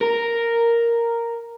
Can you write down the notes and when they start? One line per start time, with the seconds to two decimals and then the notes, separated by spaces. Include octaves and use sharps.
0.01 A#4